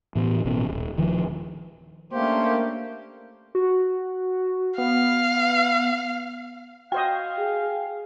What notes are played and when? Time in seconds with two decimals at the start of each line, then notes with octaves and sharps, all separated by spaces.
0.16 A2 E3 B3
0.45 A1 B2 C#4
0.68 D#1
0.97 D#1 D#2 D#3 F3
2.13 A3 A#3 C#4 D4 G4 C5
3.55 F#4
4.78 B3 F5
6.92 F#4 C5 D#5 F5 G5
7.39 G#4